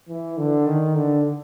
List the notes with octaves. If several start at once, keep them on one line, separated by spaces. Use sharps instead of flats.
E3
D3
D#3
D3